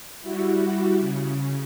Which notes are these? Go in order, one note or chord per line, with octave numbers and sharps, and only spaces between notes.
G3 E4 F#4
C#3